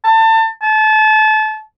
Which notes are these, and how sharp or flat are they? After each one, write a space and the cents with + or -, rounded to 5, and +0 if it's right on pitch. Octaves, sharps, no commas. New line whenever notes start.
A5 +30
A5 -30